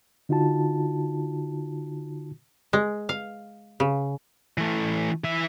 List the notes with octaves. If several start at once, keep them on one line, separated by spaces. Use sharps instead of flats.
D3 D#4 F4 F#4 A5
G#3
F5
C#3
E3 A3
E3 E5